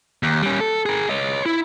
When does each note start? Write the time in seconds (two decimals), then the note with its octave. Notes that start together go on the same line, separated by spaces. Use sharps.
0.23 D#2
0.42 G3 C#4
0.61 A4
0.86 G#4 A#4
1.09 C#5 D#5
1.46 E4